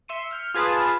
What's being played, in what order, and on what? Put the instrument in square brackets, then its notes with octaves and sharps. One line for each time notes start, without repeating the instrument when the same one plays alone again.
[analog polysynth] E5 C6 C#7 D#7
F6 G6 C#7
F4 G#4 B4 A5